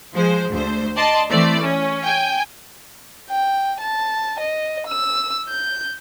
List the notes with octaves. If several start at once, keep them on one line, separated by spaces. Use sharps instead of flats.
F3 G#3 C5
D2 C5
D5 D#5 A5 C6
E3 A3 C4 D5
C#4
G5 G#5
G5
A5
D#5
E6
G6